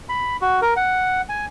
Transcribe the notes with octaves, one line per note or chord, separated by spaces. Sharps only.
B5
F#4
A#4
F#5
G#5